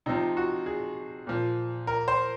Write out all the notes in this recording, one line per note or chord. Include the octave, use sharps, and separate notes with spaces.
C3 F3 D#4
F#4
G#4
A#2 F3
A#4
C5